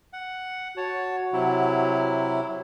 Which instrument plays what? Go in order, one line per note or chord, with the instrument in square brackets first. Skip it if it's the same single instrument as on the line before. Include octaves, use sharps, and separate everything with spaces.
[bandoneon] F#5
[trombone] F#4 [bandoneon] C#5 A5
[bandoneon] C3 F#3 E4